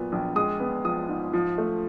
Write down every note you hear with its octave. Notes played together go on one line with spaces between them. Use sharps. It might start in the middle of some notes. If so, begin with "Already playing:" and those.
Already playing: A#2 F#3 B3
A#1
G#3 D#6
B3
F3 D#6
G#2
F3
A3